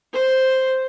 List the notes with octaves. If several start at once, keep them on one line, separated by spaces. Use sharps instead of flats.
C5